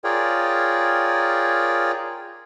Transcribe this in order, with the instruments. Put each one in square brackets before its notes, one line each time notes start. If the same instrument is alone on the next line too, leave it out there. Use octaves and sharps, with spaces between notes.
[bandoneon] F4 G#4 A#4 C#5 D5 G5